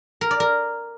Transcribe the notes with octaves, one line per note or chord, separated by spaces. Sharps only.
A#4
D5
A#4